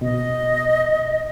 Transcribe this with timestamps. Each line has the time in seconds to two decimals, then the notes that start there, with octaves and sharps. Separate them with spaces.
0.01 B2 D#5